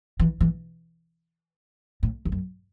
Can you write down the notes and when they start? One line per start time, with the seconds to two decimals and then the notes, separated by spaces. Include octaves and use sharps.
0.20 E3
0.41 E3
2.03 A2
2.25 E2
2.32 F#2